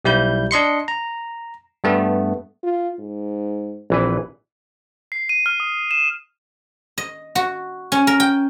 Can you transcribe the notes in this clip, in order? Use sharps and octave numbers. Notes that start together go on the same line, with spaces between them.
B1 G3 E4 G6
D4 D#5 C6 C#7
A#5
G2 A3 B3
F4
G#2
A#1 E3 C4 B4
C7
D#7
F6
D#6
E7
D#5
F#4
C#4
A#4
G5